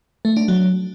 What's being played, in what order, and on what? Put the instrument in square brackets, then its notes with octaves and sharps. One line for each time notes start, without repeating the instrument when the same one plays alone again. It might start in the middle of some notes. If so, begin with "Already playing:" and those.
[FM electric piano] A3
D4
F#3